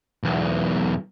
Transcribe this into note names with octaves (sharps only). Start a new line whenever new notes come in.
B1 E2